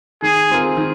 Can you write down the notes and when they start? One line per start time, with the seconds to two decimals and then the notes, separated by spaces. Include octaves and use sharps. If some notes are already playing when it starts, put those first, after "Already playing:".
0.22 D#3 G#4
0.50 G#3 C4 F4 A#4
0.77 D#3